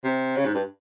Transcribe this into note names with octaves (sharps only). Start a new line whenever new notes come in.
C3
C#3
G#2
G2